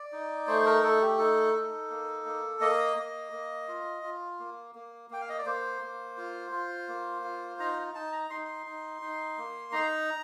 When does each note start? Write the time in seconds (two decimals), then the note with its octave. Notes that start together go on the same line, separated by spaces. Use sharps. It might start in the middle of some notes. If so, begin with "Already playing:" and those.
Already playing: D5
0.12 D#4
0.47 A3 C5
0.66 A#4
0.84 A3 A4
1.02 G4
1.18 D#4 A4
1.54 D#4
1.90 A#3
2.26 A#3
2.61 A#3 D#5
2.97 A#3
3.33 A#3
3.68 F4
4.03 F4
4.39 A#3
4.75 A#3
5.10 A#3 G5
5.21 F5
5.29 D#5
5.38 D5
5.46 A#3 C5
5.81 A#3
6.17 F4
6.52 F4
6.88 A#3
7.24 F4
7.59 D#4 A#5
7.95 D#4 A5
8.12 A#5
8.30 D#4 C6
8.45 C6
8.66 D#4
9.02 D#4
9.38 A#3
9.72 D#4 A#5